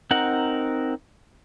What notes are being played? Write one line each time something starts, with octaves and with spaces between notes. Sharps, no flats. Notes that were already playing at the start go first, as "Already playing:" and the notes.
C4 D#4 A#4 F#5